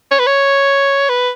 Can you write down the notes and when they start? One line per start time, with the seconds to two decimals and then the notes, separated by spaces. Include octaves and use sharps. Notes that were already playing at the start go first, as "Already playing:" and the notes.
0.12 C#5
0.19 B4
0.27 C#5
1.09 B4